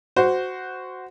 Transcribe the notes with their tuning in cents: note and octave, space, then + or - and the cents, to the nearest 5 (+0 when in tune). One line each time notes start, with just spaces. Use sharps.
F#4 +0 C5 -15